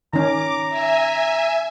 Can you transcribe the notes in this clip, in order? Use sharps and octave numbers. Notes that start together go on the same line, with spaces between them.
D#3 C#4 A#5 D6
E5 G#5